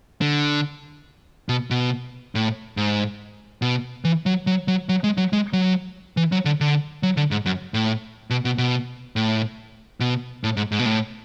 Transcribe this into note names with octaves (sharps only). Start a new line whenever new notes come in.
D3
B2
B2
A2
G#2
B2
E3
F#3
F#3
F#3
F#3
G#3
F#3
G#3
F#3
E3
F#3
D3
D3
F#3
D3
G#2
F#2
A2
B2
B2
B2
A2
B2
A2
G#2
G#2
B2
A2